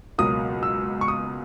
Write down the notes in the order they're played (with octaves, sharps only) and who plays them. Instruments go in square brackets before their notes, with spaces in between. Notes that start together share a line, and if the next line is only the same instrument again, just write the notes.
[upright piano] C#2 B2 F#3 A#3 [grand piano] D#6
[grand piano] E6
C#6
D#6